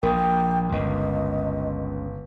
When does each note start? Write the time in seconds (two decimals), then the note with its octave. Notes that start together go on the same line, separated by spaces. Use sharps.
0.03 A#1 A#2 A#4 G5 D#6
0.72 G1 C#2 D#5